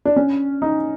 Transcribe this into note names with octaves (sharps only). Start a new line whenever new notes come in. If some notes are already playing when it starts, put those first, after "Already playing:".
D4
C#4
D#4